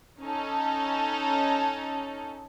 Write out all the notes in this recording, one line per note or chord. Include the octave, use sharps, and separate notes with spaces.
C#4 D#4 A4